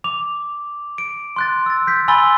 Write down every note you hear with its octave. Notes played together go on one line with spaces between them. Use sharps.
D6 F7
D7
C6 F#6 A6
E6 A6
G6 B6
G#5 B5 C6 E6 A6 G7